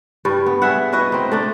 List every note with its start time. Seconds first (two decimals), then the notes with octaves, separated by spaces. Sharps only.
0.25 G2 G3
0.46 B3
0.62 G3 G#4 E5 F#5
0.92 E4 F#4 B4 D#5
1.12 C4 D#4
1.32 A3 D4 D#4